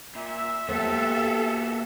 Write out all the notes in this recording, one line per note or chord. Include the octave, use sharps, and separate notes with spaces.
A#2 E5
A#3 B3 F#4 G4 A4 C5